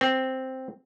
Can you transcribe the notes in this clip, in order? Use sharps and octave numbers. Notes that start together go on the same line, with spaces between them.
C4